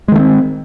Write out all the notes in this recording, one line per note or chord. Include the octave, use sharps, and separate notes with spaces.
D#3 G#3 A3 C4